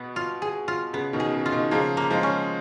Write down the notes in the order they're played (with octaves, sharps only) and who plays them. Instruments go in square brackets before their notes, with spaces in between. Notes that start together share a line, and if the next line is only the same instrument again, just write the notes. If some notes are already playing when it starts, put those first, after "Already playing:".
Already playing: [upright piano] B2 [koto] B3
[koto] F4
G#4
F4
[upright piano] C#3 [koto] B3
[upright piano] B2 D#3
[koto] G#4
[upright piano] C#3
[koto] F4
[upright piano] B2 D#3
[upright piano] C#3 F3 [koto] A#3
[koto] A#3
[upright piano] F3 G#3
[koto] C#4